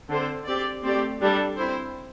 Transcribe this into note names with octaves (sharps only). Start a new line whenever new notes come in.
D3 C4 A4 C5
C4 G4 D5
A3 C4 G4 D5
G3 D4 A4
C4 E4 C5